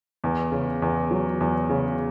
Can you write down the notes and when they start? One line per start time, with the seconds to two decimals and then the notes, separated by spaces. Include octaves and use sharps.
0.24 E2
0.52 C#3
0.82 E2
1.11 F#3
1.40 E2
1.70 C#3